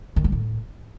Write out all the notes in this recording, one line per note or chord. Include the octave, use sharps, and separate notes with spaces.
D#3
G3
A2